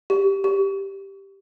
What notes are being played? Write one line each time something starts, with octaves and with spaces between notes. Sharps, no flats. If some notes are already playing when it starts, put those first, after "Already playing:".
G4
G4